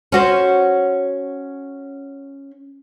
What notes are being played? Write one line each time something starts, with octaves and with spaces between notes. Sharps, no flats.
C#4 F#4 C5